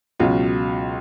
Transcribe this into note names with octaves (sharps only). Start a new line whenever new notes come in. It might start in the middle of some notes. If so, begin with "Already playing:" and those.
C#2 B2 F#3 F4